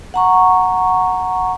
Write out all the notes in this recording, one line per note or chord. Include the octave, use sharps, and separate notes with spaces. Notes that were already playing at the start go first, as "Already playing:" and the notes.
F#5 A#5 C#6